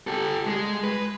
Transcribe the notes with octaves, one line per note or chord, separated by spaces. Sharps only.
G4 A4
G#3
B4